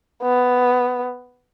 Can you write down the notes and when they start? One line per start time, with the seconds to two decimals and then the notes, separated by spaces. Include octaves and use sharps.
0.23 B3